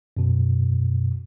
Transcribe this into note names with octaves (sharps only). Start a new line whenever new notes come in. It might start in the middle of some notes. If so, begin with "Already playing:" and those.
F#2 B2